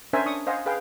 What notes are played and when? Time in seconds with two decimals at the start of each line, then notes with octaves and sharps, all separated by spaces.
0.13 C#4 D4 A#4 C5 E5 G#5
0.26 D4 C#6 D#6
0.47 C5 D#5 F5 F#5 G#5
0.66 G#4 B4 F5 G5